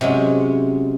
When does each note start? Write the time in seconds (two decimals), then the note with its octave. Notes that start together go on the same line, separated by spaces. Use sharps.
0.01 C3 F#3 G#3 C#4